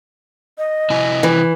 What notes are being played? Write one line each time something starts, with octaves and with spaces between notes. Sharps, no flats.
D#5
C3 E4 G#5
E3